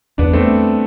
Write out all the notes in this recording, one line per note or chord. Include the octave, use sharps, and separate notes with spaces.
E2 B3 D4
A3 C4